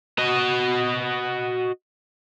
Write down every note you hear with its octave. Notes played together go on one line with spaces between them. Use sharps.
F#4 D#5